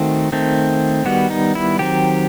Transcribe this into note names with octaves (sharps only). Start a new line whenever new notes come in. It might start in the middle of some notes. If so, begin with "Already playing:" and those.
Already playing: D#3 A3 C4 F#4
D#3 A3 C4
D#3 G3 B3 F#4
D#4
E4
D#3 F#3 C4 G4